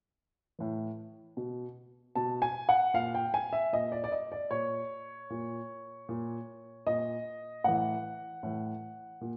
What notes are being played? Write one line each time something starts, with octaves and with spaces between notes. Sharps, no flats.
A2 E3
B2
B2 A5
G#5
F#5
A#2 F5
G5
G#5
E5
A#2 D#5
D5
D5
D#5
D5
A#2 C#5
A#2
A#2
A#2 D#5
A2 E3 F#5
A2 E3
A#2